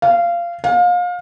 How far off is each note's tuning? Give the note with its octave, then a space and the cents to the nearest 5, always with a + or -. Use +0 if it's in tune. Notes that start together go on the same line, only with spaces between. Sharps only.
F5 -20
F5 +30